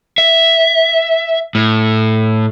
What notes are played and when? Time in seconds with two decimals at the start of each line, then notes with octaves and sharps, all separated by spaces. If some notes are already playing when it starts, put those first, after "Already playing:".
0.18 E5
1.55 A2